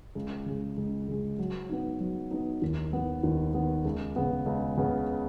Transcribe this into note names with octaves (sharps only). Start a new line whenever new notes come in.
C#2
C#3 G#3
C#2
C#3 G#3
F#3
B3 D#4
F#3
B3 D#4
D#2
D#3 B3
D#2
D#3 B3
C#2
C#3 B3
C#2
C#3 B3